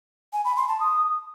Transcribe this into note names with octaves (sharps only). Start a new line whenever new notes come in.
G#5
B5
C6
A5
D#6